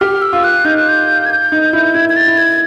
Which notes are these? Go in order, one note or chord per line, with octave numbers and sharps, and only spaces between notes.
G4 F6
E6
F4
F#6
D#4 G6
F#6
G6
G#6
G6
D#4
E4
E4 G#6
G#6
A6
E4
G#6